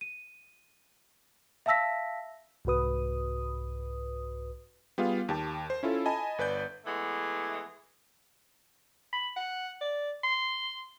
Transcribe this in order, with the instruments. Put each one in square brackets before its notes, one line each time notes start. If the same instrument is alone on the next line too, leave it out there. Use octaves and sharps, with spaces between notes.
[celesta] D#7
E5 F5 A5 E6 A#6 B6
[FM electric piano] C2 G#2 F#4 B4 D#6
[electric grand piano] G3 B3 F4 G#4 F5
D#2 G4 A5
C5
C#4 E4 F4 A4
D#5 G#5 A5 B5
G1 B4 D5 G6
[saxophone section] E3 G#3 A3 B3
[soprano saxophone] B5
F#5
D5
C6